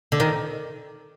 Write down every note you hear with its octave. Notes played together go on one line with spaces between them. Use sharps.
D3
D#3